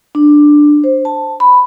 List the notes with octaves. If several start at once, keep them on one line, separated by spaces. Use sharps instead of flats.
D4
C5
A5
B5